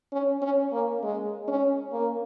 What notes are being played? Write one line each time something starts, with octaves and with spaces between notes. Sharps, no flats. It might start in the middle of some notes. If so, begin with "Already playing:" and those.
C#4
C#4
A#3
G#3
C#4
A#3